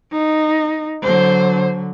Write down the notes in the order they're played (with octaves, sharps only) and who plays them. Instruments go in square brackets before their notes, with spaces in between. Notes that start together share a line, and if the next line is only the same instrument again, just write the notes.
[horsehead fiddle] D#4
[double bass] D3 F#3 [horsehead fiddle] C5